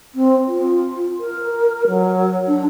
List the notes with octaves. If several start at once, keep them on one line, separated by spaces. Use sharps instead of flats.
C4
F4
A#4
F#3
D4